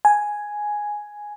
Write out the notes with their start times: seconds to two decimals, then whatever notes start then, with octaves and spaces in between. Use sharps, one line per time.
0.05 G#5